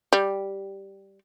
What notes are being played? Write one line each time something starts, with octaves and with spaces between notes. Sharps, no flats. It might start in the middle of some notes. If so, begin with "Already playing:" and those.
G3